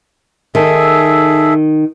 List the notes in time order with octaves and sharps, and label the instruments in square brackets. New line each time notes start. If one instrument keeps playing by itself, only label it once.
[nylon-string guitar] D#3 [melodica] G#4 A4 E5